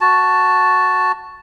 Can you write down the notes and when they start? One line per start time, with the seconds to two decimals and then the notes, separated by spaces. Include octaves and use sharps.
0.01 F#4 A5